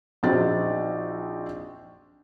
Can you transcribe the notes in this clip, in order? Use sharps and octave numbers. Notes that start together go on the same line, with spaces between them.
A#1 C4 D#4 F#4 A6